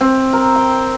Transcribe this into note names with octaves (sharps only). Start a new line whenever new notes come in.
C4
A#4
G5